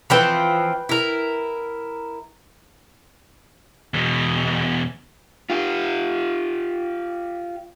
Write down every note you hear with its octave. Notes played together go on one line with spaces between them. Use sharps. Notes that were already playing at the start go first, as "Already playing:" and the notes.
E3 F3 C4 B4 G5 B5
E4 A#4
E2 B2
F4 G4